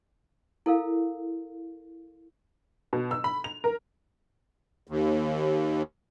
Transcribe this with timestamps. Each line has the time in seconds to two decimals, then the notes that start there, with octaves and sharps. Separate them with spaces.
0.66 E4 A4 A#4 F5
2.93 B2
3.11 E6
3.24 B5
3.44 F7
3.64 A#4
4.87 D#2